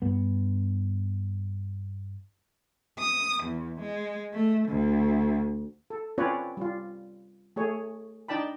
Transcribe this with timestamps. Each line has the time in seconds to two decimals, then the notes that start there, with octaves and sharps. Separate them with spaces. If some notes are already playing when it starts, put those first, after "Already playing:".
0.02 G2 B3
2.99 D#6
3.43 E2
3.80 G#3
4.34 A3
4.69 D2
5.90 A4
6.18 C4 C#4 F4 B4 C#5 D5
6.57 G3 F4
7.56 A3 G#4 C#5
8.28 D4 D#4 D5 G5 A5 B5